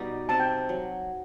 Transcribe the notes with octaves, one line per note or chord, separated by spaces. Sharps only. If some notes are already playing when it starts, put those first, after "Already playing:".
Already playing: B2 G3 D#4
C3 A5
G5
A5
F#3